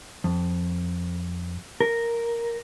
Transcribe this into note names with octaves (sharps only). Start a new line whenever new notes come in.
F2
A#4